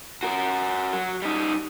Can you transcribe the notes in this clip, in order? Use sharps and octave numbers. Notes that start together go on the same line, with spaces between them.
F#4 A#4
F#3
G3 D#4